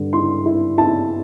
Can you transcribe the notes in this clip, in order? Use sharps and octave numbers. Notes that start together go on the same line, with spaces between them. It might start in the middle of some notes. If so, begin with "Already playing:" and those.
Already playing: G2 D3
E4 C6
E4
E4 A5